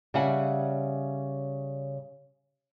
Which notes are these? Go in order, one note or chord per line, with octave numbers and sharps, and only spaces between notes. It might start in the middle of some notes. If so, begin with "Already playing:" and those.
C#3 G3 E5 F#5 G#5